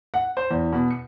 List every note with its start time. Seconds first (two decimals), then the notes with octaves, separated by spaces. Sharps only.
0.14 F#5
0.37 C5
0.51 E2
0.73 B2
0.91 C#7